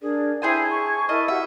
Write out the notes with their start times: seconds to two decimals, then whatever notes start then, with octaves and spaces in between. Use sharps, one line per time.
0.01 D4 G#4 A#4 D5
0.42 E4 G#4 C5 G#5 A5 G#6
0.70 C#6
1.09 E4 A#4 D#5 A5 F6
1.28 F#4 G4 E5 F#5